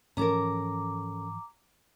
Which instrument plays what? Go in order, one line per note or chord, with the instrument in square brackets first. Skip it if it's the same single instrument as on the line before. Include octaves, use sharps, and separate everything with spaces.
[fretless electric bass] G#2 E3 F3 [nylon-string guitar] C#4 A4 A#4 [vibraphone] A#5 D6